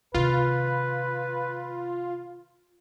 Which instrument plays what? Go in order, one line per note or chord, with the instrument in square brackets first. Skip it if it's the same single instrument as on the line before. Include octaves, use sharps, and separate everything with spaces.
[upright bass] C3 D#3 [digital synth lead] F4 [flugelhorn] B4